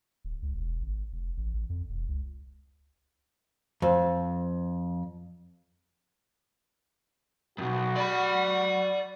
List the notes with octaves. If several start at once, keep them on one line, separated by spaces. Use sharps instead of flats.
D1
C#2
E1
G#1
F1
A1
A1
F2
E1
C#2
F2
B1 F#2 F#4
D5 B5